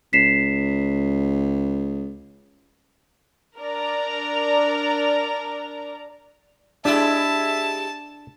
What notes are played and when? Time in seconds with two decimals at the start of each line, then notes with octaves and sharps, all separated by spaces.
0.13 C#2 B6 C7 E7
3.59 D4 A#4 D5 A#5
6.85 G#3 D4 E4 G4 E5 A5